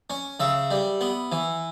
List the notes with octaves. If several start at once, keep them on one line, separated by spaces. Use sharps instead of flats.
C#4
C#3 E5
G3
B3
E3